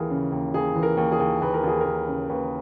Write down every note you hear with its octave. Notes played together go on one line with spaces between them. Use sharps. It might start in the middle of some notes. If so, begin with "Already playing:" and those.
Already playing: D#2 E3 G#4 A#4
C#3
D#2
D#2 G#4
E3
A#4
D#2
G#4
D#2
D#2 B4
A#4
D#2 G#4
D#2 A#4
C#3
D#2 B4